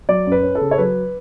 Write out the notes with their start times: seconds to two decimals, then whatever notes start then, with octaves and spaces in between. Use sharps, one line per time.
0.09 F#3 D5
0.26 F#2
0.32 B4
0.43 C#4
0.55 A4
0.61 C#3
0.71 C#5
0.78 F#3 B4